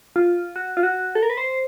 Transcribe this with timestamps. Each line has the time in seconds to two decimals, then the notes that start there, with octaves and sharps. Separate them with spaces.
0.16 F4
0.56 F#4
0.77 F4
0.83 F#4
1.15 A4
1.23 A#4
1.30 B4
1.37 C5